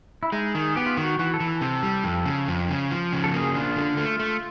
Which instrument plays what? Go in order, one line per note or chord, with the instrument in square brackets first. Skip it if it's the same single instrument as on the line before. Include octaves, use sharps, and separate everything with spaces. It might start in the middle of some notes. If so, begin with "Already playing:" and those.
[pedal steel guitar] E4
[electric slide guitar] G#3 [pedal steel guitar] D#4
[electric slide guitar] D#3 [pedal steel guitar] G#4
[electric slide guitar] B3 [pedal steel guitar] G4
[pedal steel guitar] F4
[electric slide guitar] D#3 [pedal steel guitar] F#4
[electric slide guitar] E3 [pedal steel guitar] F#4
[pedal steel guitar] A4
[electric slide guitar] E3
[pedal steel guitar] A4
[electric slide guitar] C3
G3
F2
C#3
F2
C#3
F3
C#3
[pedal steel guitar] A4
[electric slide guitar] A#3 [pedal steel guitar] G#4
[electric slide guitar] D4 [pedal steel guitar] F4
[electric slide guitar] D3
A3
A3